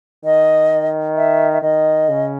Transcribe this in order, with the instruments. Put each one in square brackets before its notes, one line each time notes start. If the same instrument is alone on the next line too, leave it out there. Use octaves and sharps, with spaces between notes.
[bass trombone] D#3 [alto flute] D#5
[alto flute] E5
E5
[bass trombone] D#3 [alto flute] D#5
[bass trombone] C#3